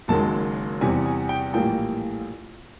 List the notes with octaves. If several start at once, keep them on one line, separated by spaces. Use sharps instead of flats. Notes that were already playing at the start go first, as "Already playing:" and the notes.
F#1 F#2 D#3 G#3 A5
E2 C3 E3 G3 G#5
G#5
G5
A#1 A2 E3 G3 A#3 G5